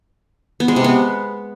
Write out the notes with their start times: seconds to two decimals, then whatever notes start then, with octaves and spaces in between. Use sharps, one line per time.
0.60 B3
0.68 G#3
0.76 C3
0.84 B3